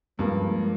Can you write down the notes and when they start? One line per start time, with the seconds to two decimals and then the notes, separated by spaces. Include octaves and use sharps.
0.19 G2 F3 G#3 A#3